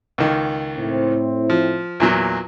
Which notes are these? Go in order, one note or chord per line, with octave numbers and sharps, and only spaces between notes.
C#2 D#3
A2 C4 E4
F3
E2 A#2 F#3